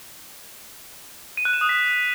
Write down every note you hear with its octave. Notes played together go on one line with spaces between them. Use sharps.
D#7
F#6
E7
D#6
B6